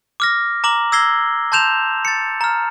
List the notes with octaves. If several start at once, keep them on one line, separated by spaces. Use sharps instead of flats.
D6 F6 A#6
A#5 D6 F#7
E6 G#6 A#6 C7 G7
A5 C6 G6 E7 F7
A6 C#7
A#5 F6